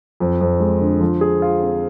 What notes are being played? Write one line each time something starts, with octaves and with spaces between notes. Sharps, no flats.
F2
F2
G#3
D3
F3
G#4
F4
C4